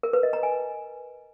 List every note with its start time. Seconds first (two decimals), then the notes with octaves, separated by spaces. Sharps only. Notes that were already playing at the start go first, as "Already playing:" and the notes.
0.03 A#4
0.13 B4
0.23 D#5
0.33 A#5
0.43 G#5